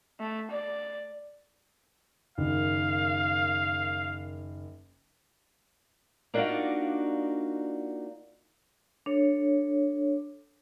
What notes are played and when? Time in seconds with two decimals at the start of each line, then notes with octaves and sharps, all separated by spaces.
0.20 A3
0.51 D5
2.38 F#1 D#3 F5
6.34 A#3 D4 D#4 F4 F#4 D5
9.06 D4 A4 C#5